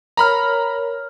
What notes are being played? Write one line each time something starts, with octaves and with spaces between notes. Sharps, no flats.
A#4 C#5 A#5 B5 F6